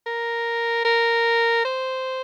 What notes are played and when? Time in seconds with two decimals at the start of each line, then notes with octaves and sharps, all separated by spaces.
0.06 A#4
0.85 A#4
1.65 C5